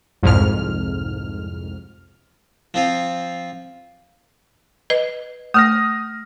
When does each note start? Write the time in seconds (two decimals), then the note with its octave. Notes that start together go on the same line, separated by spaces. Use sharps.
0.23 C2 F2 G#2 F6
2.74 F3 C4 F4
4.90 B4 D#5
5.54 A3 D#6 F6 A#6